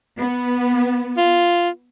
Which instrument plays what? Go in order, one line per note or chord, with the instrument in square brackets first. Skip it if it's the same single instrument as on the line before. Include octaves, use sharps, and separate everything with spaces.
[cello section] B3
[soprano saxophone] F4